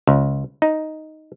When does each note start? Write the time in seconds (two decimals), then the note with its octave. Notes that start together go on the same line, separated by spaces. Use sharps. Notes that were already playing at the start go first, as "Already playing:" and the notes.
0.07 C#2
0.62 D#4